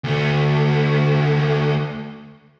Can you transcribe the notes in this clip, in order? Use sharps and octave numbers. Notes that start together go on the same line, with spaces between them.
D2 A3